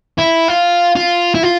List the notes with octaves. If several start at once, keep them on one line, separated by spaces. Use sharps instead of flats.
E4
F4
F4
E4
F4